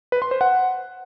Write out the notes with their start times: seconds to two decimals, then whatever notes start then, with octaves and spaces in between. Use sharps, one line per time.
0.12 B4
0.22 C6
0.31 C5
0.41 F#5